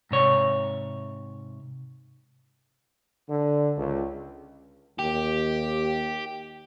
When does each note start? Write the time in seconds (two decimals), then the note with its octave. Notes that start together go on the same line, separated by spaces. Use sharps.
0.11 G#2 C3 C#5
3.29 D3
3.77 C#2
4.99 D#2 G4